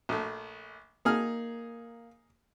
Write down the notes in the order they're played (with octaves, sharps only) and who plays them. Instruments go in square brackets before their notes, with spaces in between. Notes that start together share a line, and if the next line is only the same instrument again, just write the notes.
[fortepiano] A#1 A3
[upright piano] A#3 [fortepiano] D#4 G#4 F6